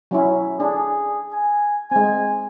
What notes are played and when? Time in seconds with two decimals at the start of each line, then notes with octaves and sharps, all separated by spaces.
0.11 F#3 C#4 E4
0.60 D4 G#4
1.33 G#5
1.91 G#3 C4 G#5